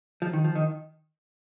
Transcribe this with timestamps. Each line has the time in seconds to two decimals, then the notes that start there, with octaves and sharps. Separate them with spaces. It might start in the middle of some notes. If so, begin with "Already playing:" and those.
0.22 F3
0.33 D#3
0.44 F3
0.55 D#3